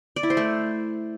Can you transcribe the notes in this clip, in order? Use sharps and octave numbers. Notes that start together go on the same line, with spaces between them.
D5
E4
C5
A3